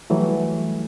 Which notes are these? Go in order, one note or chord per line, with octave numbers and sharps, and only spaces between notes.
E3 F#3 G3 A3